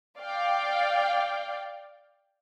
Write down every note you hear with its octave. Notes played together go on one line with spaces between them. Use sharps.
D5 F5 G5